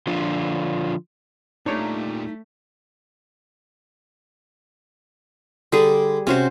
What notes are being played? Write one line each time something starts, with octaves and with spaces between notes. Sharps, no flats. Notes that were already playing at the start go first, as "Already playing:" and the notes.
D3 F3 D4 F4
A#2 G3 A3 D4 D#4 C#5
D3 G3 G#4
C3 C#4 F#4 C5